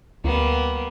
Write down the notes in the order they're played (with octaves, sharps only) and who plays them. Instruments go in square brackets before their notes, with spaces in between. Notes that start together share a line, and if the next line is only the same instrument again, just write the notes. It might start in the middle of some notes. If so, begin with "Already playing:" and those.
[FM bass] D2 [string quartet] G3 A#3 B3